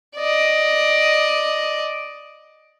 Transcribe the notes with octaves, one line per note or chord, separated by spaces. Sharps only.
D5 D#5